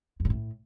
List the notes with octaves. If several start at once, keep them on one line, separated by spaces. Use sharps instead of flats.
F#2
A#2
A2